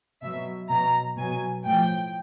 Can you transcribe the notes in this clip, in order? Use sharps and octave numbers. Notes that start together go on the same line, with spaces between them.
B2 F#3 E5
B2 F#3 A#5
B2 F#3 G#5
A2 F3 G5